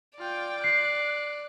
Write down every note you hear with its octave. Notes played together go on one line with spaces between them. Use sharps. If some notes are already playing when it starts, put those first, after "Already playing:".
F4 D5 G5
F#6 C7